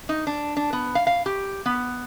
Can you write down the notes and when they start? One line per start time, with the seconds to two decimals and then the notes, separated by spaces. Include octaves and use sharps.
0.09 D#4
0.27 D4
0.57 D4
0.73 B3
0.95 F5
1.07 F5
1.26 G4
1.66 B3